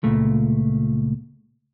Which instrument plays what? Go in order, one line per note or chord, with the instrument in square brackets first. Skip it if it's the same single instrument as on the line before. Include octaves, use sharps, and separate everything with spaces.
[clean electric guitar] C#2 A#2 A3